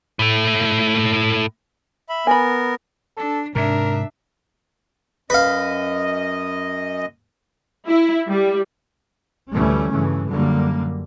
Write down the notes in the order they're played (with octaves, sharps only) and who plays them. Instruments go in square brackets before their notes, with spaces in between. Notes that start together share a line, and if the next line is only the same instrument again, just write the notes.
[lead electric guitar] A2 A3
[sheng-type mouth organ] E5 B5
[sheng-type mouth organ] B3 A#4 [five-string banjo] G#5 B5
[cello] D4 [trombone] A4
[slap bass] G#2 C3 [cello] D4 E5 [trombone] A#4
[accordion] F#2 D#5 [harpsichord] B4 F5
[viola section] E4
G3
[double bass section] D2 E3 G3 A3 C#4
G2 C#3 E3 A3
F#2 D3 G3 A#3